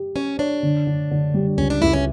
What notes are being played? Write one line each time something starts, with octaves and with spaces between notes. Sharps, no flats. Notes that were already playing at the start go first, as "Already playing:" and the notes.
Already playing: G4
C#4 C#5
D4 C#5
D3
D3
D3
G3
C#2 C#4
D4
C#2 E4
C#4